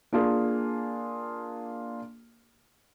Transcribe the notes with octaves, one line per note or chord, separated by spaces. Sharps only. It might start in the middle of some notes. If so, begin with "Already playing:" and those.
A#3 D4 F4 G#4